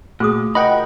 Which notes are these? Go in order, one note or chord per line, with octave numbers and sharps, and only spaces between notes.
A#2 A3 F#4 G#4 D#6
F4 A#4 D#5 F#5 G5 B5